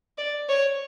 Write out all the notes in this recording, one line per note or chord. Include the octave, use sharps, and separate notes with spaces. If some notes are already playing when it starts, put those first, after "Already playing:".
D5
C#5